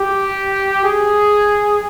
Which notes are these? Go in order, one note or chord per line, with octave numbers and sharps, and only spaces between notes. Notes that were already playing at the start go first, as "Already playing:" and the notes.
Already playing: G4
G#4